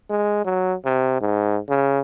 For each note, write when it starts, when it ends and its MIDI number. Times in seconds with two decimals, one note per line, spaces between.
0.10 0.44 56
0.45 0.75 54
0.85 1.19 48
1.21 1.59 44
1.69 2.00 49